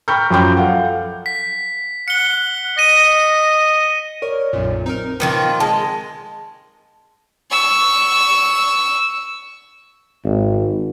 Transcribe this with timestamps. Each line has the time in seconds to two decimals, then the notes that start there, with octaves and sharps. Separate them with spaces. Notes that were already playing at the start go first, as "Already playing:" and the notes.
0.08 G5 A#5 B5 C#6 F6 G6
0.31 F#2 F3 G5 D6 G6
0.57 A4 F5 F#5
1.26 B6
2.08 F#5 C#7 G7
2.78 D#5 A#6 D#7
4.22 A#4 C#5 D5
4.53 B1 F#2 A#2
4.86 C4 D#4 A#4
5.20 A#2 D#3 F3 F4 B4
5.60 G#3 D#5 A5
7.51 C#6 E6
10.25 G#1